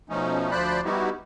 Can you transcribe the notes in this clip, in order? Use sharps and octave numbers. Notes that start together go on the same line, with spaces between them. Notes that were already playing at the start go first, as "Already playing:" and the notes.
B2 F3 A3 C#4 D#4
D2 F3 C5 D5 B5 F#6
G3 B3 D#4 E4 F#4 G4